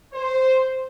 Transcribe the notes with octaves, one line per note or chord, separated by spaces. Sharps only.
C5